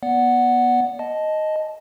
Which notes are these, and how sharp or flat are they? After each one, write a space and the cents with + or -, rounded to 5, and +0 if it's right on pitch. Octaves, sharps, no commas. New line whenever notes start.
B3 -25 D5 -25 F#5 +0
D#5 +0 A5 -15